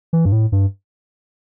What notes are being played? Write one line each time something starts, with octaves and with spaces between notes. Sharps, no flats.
E3
G2
A2
G2